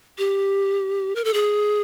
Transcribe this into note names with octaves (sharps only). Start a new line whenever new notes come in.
G4
A#4
A4
G#4